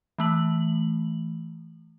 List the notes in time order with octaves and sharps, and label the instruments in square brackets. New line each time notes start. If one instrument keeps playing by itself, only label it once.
[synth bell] E3 A3 F#7